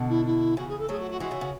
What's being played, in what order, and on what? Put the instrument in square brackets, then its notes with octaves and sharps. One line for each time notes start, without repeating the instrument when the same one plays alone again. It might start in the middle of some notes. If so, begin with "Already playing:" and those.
Already playing: [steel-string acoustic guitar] B2 D3
[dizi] E4
E4
[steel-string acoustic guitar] C#3 E3 [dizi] F#4
[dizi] G#4
A4
[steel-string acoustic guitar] F#3 A3 [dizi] G#4
[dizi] F#4
F#4
[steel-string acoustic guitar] E3 G#3 [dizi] F#4
[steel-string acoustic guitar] C#3 E3
C#3